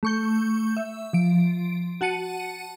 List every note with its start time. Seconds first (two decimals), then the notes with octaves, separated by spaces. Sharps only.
0.03 A3 C#6 G6
0.77 E5
1.13 F3 D7
2.01 F#4 F#5 A5 C#7 D#7